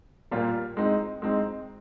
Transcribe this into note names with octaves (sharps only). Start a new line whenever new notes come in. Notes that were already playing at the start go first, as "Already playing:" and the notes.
A#2 G3 A#3 F4
G#3 C4 D#4
G#3 C4 D#4